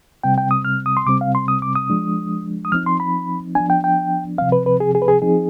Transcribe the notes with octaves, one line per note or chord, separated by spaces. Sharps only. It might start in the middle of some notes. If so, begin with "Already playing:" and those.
C3 G3 C4 G5
G5
D#6
F6
D#6
C6
C3 G3 C4 D6
F5
C6
D#6
D6
D#6
F3 G#3 D4
D#6
F3 C4 D#4 F6
C6
B5
F3 B3 D4 G#5
G5
G5
C3 F3 C4 F5
B4
B4
G#4
G#4
B4
G#4
F3 C4 D#4 G#4